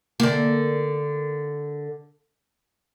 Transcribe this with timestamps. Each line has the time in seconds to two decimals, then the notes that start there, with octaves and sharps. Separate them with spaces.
0.20 D3 A#3